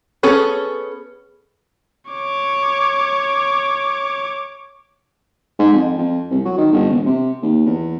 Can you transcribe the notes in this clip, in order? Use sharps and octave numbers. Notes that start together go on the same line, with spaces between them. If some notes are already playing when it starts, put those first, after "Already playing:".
B3 C#4 G#4 A4
C#5 D6
G#2
F2
F2
C2
F#3
D#3
G1
E1
C3
D#2
E2